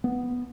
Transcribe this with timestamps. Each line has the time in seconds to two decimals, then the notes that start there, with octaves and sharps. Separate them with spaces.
0.04 B3